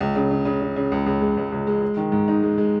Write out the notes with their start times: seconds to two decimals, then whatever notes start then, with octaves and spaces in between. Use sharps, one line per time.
0.01 C#2
0.15 C#3
0.31 C#3
0.45 C#3
0.61 C#3
0.76 C#3
0.92 C#2
1.06 C#2
1.21 G#3
1.37 C#2
1.52 C#2
1.67 G#3
1.82 G#3
1.97 D#3
2.12 G#2
2.28 D#4
2.43 G#3
2.58 G#3